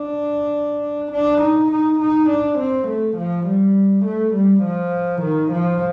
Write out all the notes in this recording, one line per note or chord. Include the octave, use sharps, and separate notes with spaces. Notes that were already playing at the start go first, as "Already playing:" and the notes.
Already playing: D4
D4
D#4
D#4
D#4
D4
C4
A3
F3
G3
A3
G3
F3
D#3
F3